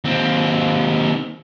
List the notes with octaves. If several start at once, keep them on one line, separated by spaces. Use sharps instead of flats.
D#2 C4